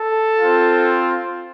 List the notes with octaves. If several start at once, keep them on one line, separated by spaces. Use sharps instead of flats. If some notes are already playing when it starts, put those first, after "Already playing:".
Already playing: A4
C4 F4